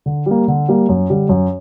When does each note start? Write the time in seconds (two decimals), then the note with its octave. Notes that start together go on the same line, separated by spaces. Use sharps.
0.06 D3
0.26 G3 A#3
0.48 D3
0.69 G3 A#3
0.89 F#2
1.10 D3 G3
1.29 F#2